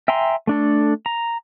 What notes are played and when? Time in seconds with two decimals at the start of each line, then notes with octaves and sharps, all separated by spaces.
0.08 E5 G5 G#5 A#5 C6
0.47 A3 D4 A4
1.06 A#5